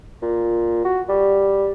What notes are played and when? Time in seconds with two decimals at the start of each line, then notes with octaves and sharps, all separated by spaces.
0.22 A#2
0.85 F#4
1.09 G3